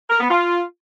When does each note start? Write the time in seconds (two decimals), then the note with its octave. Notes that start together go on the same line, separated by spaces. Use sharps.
0.10 A#4
0.20 B3
0.30 F4